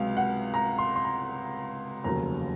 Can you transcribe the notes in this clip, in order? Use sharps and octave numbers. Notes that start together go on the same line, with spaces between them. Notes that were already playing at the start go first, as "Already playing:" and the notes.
Already playing: C#2 C3 F#3 F5
F#5
A#5
C6
C6
A#5
F1 D#2 C#3 F#3 A#5